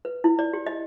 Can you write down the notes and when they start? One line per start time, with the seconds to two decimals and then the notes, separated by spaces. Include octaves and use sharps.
0.05 B4
0.24 E4
0.39 D5
0.53 G4
0.67 D#5